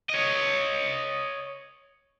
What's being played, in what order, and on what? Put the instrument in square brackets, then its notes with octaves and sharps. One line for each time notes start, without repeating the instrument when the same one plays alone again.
[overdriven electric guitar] C#5 D#5